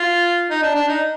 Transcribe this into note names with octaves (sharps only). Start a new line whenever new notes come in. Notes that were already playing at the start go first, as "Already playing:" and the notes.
Already playing: F4
D#4
D4
D4
D#4